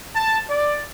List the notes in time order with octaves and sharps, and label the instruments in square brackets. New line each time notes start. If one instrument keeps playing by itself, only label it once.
[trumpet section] A5
D5